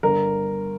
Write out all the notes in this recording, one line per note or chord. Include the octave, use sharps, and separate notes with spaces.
G1 A#4